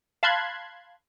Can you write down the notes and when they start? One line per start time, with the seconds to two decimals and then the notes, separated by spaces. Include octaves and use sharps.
0.23 F5 A5 B5 C6 F#6 G#6